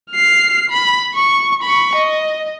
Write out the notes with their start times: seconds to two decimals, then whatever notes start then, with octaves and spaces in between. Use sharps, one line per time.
0.11 F6 C7
0.70 B5
1.15 C#6
1.63 B5 C#6
1.96 D#5